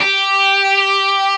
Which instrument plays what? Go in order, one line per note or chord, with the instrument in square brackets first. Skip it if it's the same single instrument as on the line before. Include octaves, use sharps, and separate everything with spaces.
[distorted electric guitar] G4